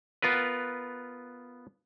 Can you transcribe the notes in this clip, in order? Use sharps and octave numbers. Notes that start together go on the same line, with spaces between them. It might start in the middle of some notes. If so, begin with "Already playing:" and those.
B3 F4 A#4 B4